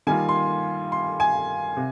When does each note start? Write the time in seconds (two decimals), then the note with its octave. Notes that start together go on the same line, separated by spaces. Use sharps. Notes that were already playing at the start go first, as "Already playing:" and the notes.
0.07 D#3 G3 A#3 F4 G#5
0.29 C6
0.92 C6
1.20 G#5
1.77 C3